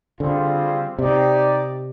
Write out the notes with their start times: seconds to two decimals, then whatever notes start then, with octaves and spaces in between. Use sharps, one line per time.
0.20 D3 G3 C4 F4 G#4 C5
0.99 C3 D#4 G4 D5